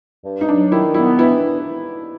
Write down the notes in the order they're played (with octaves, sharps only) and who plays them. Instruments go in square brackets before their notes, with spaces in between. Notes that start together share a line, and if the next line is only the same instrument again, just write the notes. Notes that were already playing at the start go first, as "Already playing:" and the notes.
[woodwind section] G2
[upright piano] D#4
[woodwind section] F#3 [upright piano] D4
[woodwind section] D#3 [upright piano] E4
[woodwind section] B3 [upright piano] E4
[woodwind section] E3 [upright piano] E4